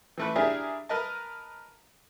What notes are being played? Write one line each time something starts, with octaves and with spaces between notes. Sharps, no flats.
E3 A3 B4
D4 E4 G4 G#4 A#4 E5
A#4 B4 D#5 A5